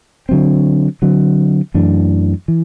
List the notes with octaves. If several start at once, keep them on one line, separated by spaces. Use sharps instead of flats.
D3 F#3 C4
D3 F#3 C4
F#2 E3 A3 D4
E3